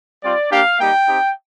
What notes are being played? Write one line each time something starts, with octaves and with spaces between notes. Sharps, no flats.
G3 C4 F4 D5
A#3 D4 G4 F5
G3 A#3 D#4 G4 G5
C4 D#4 G4